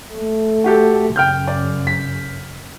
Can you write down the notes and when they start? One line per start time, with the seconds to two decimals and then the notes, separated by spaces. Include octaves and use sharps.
0.13 A3
0.64 F#4 G4 A4
1.16 F#2 C#3 G5 F6 G6
1.47 D5
1.87 B6